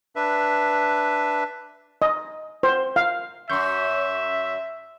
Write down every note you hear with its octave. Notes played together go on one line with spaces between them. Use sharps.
D4 B4 E5
D#5
C5
F5
F#2 F#4 E5 C6 C#6 G6